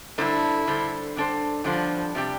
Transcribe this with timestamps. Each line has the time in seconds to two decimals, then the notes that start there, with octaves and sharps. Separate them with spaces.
0.18 D3 G3 D4 E4 A4 C5
0.67 D3 G3 D4 A4 C5
1.16 D3 G3 D4 A4 C5
1.64 D3 F3 G3 D4 A4 C5
2.15 C3 G3 D4 G4